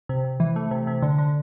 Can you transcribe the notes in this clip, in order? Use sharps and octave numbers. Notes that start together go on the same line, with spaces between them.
C3
C3
E3
A3
C3
C3
D3
D3